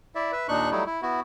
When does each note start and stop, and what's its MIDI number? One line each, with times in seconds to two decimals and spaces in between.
0.15 0.32 64
0.15 0.32 74
0.15 0.32 76
0.32 0.47 71
0.32 0.47 76
0.48 0.70 39
0.48 0.70 46
0.48 0.70 62
0.48 0.70 63
0.48 0.70 85
0.48 0.70 90
0.71 0.84 54
0.71 0.84 55
0.71 0.84 57
0.71 0.84 63
0.71 0.84 64
0.86 1.02 64
1.02 1.20 59
1.02 1.20 64
1.02 1.20 66